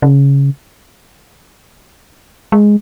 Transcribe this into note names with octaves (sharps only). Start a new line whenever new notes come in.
C#3
G#3